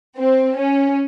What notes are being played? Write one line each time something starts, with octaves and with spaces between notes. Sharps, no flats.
C4
C#4